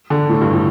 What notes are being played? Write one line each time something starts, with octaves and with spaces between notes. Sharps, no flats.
D3
A2
G2
A2